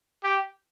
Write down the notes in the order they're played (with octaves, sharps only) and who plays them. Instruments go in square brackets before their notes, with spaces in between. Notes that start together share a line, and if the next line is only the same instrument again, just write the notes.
[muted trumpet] G4